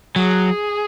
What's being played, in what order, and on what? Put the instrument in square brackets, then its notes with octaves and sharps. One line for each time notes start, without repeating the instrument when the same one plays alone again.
[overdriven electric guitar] F#3 [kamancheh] G#4